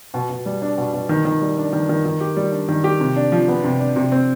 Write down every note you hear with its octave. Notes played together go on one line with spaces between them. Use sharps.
B2
B2
G3
D4
B2
B2
D#3
D#3
G3
D4
D#3
D#3
D#3
G4
G3
D4
D#3
G4
C3
D4
F3
B3
C3
D4
C3
C4